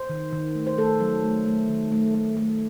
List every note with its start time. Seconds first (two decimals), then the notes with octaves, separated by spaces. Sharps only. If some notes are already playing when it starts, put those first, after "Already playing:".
Already playing: C5
0.09 D#3
0.33 D#3
0.55 A3
0.67 C5
0.78 A3 A4
1.00 F#3
1.24 A3
1.46 A3
1.69 D#3
1.92 A3
2.14 A3
2.37 A3